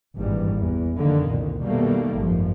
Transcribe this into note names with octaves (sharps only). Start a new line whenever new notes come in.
G#1 G2 A#2 E3 G3
E2
F1 F#2 D3 D#3 A#3
C2 A#2
B2 D#3 G3 A3 A#3
G#1 F#2 F3